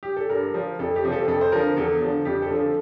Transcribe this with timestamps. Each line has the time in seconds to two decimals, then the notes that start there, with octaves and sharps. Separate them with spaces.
0.03 G4
0.17 A4
0.30 G2 A#4
0.54 F3
0.79 F2 A4
0.96 G4
1.04 C3 F3
1.12 A4
1.28 F2 A4
1.41 C5
1.52 D3 F3 A#4
1.77 E2 A4
2.02 D3 F3
2.25 F2 G4
2.42 A4
2.50 D3 F3
2.59 A4